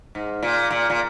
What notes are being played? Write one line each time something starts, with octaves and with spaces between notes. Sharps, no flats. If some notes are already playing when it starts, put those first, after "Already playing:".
G#2
A#2
A#2
A#2